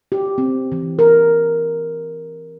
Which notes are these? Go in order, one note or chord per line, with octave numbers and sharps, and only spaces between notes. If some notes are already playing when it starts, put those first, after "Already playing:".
G4
C4
E3
A#4